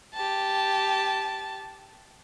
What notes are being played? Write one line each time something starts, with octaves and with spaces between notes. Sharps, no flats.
G4 A5